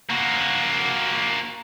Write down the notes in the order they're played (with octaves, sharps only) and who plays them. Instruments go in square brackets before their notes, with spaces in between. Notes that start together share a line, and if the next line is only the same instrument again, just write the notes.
[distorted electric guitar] A#3 F#4